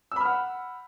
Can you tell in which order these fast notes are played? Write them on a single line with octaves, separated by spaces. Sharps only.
E6 B5 F6 F#5